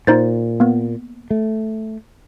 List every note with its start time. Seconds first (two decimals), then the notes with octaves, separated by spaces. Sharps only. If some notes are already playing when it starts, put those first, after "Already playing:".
0.07 A#2 D#4 C5 A6
0.60 A#3 B3
1.30 A3